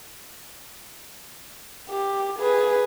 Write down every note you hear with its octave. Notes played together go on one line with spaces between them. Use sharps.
G4
G#4 B4